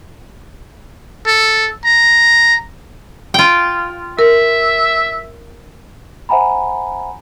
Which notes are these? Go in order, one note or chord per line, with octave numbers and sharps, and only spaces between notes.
A4
A#5
F4 G5
A#4 E5
C5 E5 F#5 G#5 A#5 B5